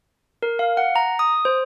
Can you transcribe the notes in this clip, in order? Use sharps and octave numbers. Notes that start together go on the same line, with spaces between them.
A#4
F5
F#5
A#5
D#6
C5